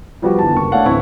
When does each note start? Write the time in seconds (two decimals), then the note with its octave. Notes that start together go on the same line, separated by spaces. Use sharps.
0.22 F3 G3 B3 F#4 G4
0.39 G1 E3 A5
0.54 F#1 C#6
0.72 A3 D4 C#5 F5 F#5 A5
0.85 D1 E3 C4 E4 C#6